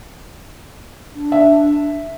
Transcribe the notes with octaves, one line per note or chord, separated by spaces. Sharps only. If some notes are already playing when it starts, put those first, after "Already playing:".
D4
E5